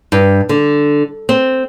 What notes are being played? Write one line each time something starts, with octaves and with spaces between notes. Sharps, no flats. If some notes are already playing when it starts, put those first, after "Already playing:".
G2
D3
C4